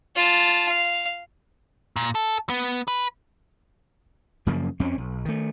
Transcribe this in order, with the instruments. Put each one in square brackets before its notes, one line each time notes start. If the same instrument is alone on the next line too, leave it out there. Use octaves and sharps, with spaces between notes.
[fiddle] F4 A5
F5
[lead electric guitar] A#2
A4
B3
B4
[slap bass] F#2 C#3 F3 A#3
F2 C4 C#4
B1
D#3 A3